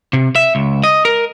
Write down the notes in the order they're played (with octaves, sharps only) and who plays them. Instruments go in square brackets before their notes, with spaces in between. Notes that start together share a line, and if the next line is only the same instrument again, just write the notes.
[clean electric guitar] C3
E5
C#2
D#5
A#4